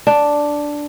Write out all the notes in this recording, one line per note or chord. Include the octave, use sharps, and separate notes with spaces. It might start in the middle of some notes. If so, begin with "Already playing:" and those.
D4